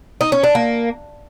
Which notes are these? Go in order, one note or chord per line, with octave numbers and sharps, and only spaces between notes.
D#4
C#4
D4
A#3